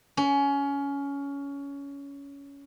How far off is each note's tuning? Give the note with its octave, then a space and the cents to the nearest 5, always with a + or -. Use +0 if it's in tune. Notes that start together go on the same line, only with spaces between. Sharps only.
C#4 +20